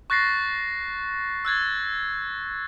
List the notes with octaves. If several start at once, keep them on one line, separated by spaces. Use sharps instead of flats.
C#6 F#6 A6 A#6 C7
E6 F#6 G#6 A6